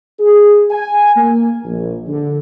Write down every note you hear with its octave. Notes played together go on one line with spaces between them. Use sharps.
G#4
G#5
A#3
A#1
D3